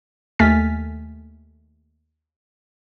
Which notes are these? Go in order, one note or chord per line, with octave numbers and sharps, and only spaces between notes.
D#2 A3 G#5 F6 A6 B6